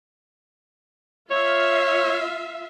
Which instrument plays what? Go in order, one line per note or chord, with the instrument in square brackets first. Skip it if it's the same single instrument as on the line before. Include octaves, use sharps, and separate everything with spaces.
[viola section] F4 E5 F5 [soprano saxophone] C#5